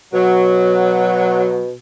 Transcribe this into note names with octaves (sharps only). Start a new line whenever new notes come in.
B2 F#3